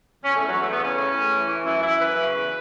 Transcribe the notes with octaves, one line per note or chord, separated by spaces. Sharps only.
E2 C#4
A3
E3
F#3
E2 A3
B3
C#3
C#4
A2
A2
E3
E3
F#2 E4
E3 E4
F#2 B4
C#3
E2